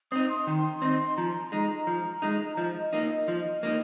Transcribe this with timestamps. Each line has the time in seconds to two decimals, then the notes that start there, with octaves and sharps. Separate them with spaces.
0.11 C4 D#4 D#6
0.29 C6
0.47 D#3
0.82 C4 D#4
1.17 F3 A#5
1.52 G#3 D#4
1.87 F3
2.22 G#3 D#4
2.57 F3 D#5
2.93 A#3 D#4
3.28 F3
3.63 A#3 D#4